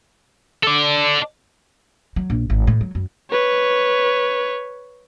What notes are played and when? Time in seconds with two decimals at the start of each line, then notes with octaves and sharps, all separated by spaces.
0.63 A4 D5
2.16 F#3
2.30 A#1
2.50 G#1
2.67 A2
2.81 F#3
2.95 F#2
3.30 B4 C#5